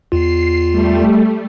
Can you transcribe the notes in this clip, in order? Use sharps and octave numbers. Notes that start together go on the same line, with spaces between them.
E2 F4 C7
G3 A3